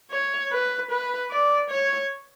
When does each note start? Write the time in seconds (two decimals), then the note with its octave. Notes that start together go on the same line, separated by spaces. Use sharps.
0.11 C#5
0.51 B4
0.90 B4
1.30 D5
1.70 C#5